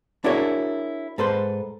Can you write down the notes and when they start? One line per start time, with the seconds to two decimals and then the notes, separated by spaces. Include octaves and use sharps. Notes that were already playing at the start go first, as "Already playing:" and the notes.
0.24 D4 E4 F#4 G#4 A#4 C#5
1.18 G#2 A4 B4 C5